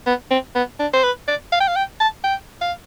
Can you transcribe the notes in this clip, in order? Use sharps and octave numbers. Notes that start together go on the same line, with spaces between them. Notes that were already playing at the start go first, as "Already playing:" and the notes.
B3
C4
B3
D4
C5
B4
D5
F5
G5
F5
G5
A5
G5
F5